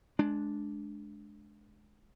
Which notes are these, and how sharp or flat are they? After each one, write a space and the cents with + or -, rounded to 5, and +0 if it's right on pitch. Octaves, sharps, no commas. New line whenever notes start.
G#3 +25 D4 +0